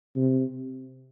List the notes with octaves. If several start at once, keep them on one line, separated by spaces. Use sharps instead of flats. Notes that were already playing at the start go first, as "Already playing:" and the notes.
C3